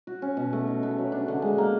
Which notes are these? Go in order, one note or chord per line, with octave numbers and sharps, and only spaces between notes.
F#4
C#4
B2
A3
D#4
B3
F#3
D4
D3
G#3
A#3